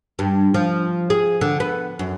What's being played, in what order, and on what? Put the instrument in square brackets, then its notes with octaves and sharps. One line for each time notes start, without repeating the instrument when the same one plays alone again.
[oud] G2
F3
G#4
D3
B3
F#2